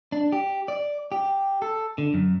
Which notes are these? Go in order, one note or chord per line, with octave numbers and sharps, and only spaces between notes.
D4
G4
D5
G4
A4
D3
F#2